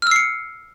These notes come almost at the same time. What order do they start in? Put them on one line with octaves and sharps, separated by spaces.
F6 E6 C7 C#7